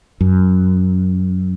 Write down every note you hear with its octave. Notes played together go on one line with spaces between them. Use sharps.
F#2